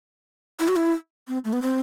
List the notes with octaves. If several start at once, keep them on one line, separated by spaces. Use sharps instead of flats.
E4
F#4
E4
C4
A3
B3
C4